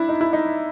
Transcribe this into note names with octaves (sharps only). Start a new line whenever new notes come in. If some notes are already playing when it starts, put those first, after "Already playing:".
Already playing: D4 E4
D#4
E4
D#4